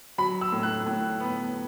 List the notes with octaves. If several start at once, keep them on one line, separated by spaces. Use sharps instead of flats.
F#3 B5
E6
A2
F#6
A2
B3